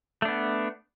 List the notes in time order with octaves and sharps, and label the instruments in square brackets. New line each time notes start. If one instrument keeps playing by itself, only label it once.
[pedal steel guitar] A3
D4
B3